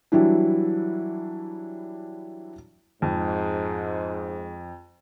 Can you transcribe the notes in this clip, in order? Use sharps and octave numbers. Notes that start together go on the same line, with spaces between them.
E3 F#3 G3 D4 E4
F2 G#2